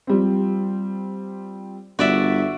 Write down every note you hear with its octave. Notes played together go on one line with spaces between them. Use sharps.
F3 G3 C4
G1 F#4 D5 E5